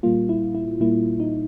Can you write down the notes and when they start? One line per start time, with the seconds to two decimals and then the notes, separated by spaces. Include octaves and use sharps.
0.03 A#2 G3 A#3 F4
0.29 E4
0.55 E4
0.80 A#2 G3 A#3 E4
1.20 D#4